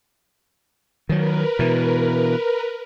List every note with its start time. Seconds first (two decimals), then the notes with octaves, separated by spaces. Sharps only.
1.09 D#3 F#3 A#4 B4
1.59 B2 E3